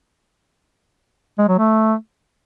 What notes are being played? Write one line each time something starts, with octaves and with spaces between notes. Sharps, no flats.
G#3
F#3
A3